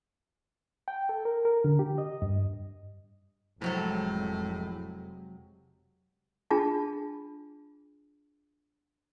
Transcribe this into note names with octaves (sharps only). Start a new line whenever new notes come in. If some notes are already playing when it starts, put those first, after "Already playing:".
G5
A4
A#4
A#4
D3
G4
D#5
G2
F1 A2 C3 F#3 G#3 A4
D4 F4 G#4 A5